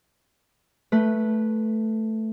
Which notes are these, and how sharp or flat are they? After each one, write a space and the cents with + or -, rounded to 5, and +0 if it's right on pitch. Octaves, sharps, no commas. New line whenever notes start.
A3 +0 B4 -10